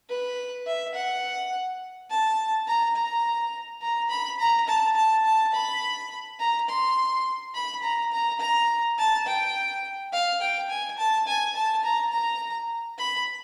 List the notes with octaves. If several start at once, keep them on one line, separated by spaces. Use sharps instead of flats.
B4
E5
F#5
A5
A#5
A#5
A#5
B5
A#5
A5
A5
A5
B5
A#5
C6
B5
A#5
A#5
A#5
A5
G5
F5
G5
G#5
A5
G#5
A5
A#5
A#5
B5